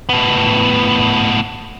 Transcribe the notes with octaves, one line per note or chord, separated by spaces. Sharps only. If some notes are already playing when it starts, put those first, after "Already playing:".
A2 B3